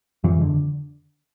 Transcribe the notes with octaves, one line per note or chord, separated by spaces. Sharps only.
F2 E3
D3